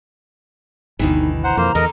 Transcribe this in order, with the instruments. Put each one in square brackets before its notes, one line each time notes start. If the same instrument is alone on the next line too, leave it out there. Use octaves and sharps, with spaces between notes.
[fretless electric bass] G1 D2 [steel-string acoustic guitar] B2 D#3 E3 [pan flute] D#4
[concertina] C5 F#5 [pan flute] A#5
[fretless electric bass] F2 [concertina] A#3 C5
[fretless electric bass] E2 [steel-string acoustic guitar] D3 A4 [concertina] A#4 D#5